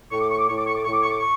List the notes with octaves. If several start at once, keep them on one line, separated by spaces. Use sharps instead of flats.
A2 C#6
D6
C#6
D6
A2 C#6
D6
C#6
D6
A2 C#6
D6
C#6
D6
C#6